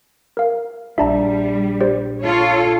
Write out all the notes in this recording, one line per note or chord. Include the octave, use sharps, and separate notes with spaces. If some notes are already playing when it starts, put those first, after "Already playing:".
A#4 F5
A#1 G3 D4 E5 A5 A#5
G4 C5 D5
F4 A4 C#5